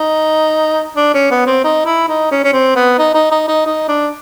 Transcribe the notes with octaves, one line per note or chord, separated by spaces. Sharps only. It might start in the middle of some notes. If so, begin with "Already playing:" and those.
Already playing: D#4
D4
C#4
B3
C4
D#4
E4
D#4
C#4
C#4
C4
B3
D#4
D#4
D#4
D#4
D#4
D4